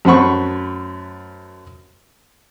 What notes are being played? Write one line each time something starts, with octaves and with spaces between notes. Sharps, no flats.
F#2 A3 C5 F#5 B5 C#6